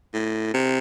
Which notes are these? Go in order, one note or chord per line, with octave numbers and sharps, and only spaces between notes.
A2
C3